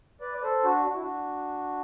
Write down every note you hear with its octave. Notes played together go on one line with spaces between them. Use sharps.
B4 D5
D5
A4 C5
D4 F#4
F#4
E4
D4 F#4